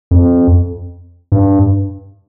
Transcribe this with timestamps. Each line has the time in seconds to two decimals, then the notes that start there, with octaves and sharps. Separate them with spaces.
0.11 F2
1.32 G2